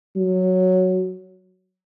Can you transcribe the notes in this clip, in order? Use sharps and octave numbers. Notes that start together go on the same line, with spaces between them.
F#3